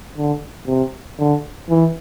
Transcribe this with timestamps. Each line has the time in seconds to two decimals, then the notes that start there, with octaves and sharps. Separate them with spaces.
0.17 D3
0.67 C3
1.19 D3
1.69 E3